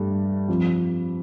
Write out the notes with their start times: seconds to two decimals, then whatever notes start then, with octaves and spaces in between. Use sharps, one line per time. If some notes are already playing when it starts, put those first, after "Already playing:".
Already playing: G2 G3 A3
0.48 F2 F3